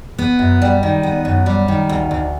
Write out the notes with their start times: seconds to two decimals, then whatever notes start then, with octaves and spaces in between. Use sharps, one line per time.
0.19 B3
0.39 F#2
0.62 G3
0.83 D#3
1.03 B3
1.25 F#2
1.46 G3
1.68 D#3
1.89 D2
2.11 D2